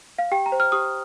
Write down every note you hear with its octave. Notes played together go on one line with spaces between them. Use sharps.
F5
G4 G5
A#5
C5
F6
G4 D#6